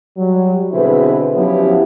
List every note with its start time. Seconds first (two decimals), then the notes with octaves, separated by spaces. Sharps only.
0.17 F#3 G3
0.72 B2 D3 C4 E4 G#4 B4
1.35 F3 F#3 B3 C#4 E4 G4